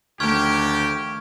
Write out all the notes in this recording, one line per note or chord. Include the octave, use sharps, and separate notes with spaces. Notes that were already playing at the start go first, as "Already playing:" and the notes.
D2 D#3 F3 A3 G4 C#6 F6 G#6